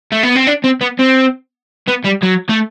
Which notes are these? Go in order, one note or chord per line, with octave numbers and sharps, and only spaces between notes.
A3
B3
C4
D4
C4
B3
C4
B3
G3
F#3
A3